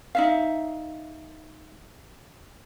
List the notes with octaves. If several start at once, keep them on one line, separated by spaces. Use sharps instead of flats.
D#4 E5 F5